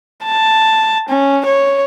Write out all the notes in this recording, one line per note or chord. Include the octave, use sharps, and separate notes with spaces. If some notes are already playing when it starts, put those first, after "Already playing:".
A5
C#4
C#5